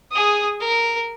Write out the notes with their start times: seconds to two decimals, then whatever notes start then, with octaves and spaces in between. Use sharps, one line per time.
0.12 G#4 D#6
0.60 A#4